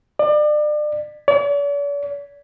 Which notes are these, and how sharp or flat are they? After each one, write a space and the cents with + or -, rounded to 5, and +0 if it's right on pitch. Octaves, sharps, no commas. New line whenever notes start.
D5 +35
D5 -45